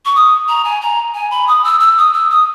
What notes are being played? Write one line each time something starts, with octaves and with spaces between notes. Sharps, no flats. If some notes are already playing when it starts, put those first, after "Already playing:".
C#6
D#6
A#5
G#5
A#5
G#5
B5
D#6
E6
E6
D#6
E6
D#6